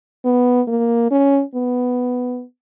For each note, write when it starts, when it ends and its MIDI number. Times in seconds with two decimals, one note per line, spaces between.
0.25 0.61 59
0.68 1.10 58
1.11 1.42 61
1.55 2.43 59